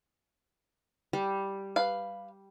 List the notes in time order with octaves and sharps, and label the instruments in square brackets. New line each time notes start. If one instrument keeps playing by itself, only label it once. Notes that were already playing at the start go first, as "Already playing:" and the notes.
[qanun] G3
[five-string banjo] B4 F5